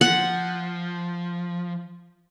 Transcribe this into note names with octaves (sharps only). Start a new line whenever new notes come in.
F3 F#5